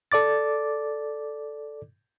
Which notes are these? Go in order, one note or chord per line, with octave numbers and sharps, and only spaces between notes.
A4 D5 D6 A6